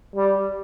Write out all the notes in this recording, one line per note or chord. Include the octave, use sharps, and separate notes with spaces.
G3